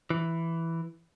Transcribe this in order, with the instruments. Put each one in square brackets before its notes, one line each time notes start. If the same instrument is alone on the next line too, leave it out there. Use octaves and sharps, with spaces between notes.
[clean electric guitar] E3